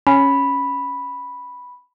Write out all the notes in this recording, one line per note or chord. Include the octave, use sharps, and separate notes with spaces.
C#4 B5